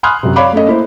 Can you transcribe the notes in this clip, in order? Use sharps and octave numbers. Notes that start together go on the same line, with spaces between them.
G#5 B5 C6 D#6 F6 F#6
F#2 C3
C#5 D5 F5 B5 D6
A3 C#4 A4 D#5
A#3 E4 C5